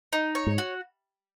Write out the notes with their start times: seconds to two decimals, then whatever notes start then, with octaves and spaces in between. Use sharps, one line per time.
0.13 D#4
0.35 C#5
0.47 G#2
0.58 F#4